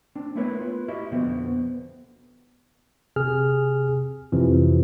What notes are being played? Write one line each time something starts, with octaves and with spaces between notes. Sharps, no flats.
C4 D4
A3 B3 E4 A#4 B4 C#5
F4 B4
E4 F#4 G4 D#5 E5
F2 B2 D3 B3 C4
C3 G#4 F6
F2 C3 E3 F3